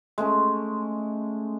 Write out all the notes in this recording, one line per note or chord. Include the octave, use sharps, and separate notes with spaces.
G#3 A3 C#4